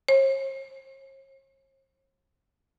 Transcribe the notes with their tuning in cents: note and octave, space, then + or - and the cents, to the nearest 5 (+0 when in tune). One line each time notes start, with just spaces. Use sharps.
C#5 -45